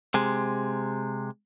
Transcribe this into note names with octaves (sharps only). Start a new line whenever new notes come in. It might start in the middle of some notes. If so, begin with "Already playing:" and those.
C3 G#3